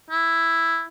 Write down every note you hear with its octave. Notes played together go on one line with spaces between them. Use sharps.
E4